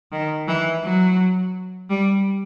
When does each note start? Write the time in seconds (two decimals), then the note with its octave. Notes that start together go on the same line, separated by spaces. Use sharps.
0.12 D#3
0.48 E3
0.84 F#3
1.90 G3